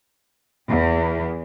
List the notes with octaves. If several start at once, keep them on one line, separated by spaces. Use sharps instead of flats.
E2